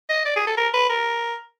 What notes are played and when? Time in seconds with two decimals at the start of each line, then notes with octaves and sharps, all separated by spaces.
0.10 D#5
0.26 D5
0.36 G#4
0.47 A4
0.57 A#4
0.74 B4
0.90 A#4